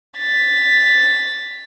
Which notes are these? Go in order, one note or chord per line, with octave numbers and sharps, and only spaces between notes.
A6 B6